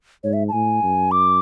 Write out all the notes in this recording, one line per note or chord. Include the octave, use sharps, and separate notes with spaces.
G#2 C#5
E5
A5
A2 G#5
F#2
D6